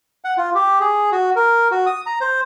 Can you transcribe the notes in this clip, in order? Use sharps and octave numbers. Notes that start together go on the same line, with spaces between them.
F#5
F4
G4
G#4
F#4
A#4
F#4
D#6
A#5
C5